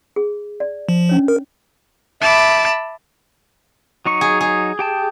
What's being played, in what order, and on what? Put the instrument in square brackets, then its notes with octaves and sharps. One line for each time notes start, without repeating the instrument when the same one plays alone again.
[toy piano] G#4
D5
[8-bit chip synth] F3
[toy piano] C#4 D4 C#5
[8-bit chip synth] A#4
[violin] E5 B5 [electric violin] A5 D6
[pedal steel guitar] F#3 D#4 C#6
[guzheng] G#4
G#4
[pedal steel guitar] G4 G5 A5